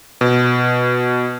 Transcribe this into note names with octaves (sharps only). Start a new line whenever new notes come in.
B2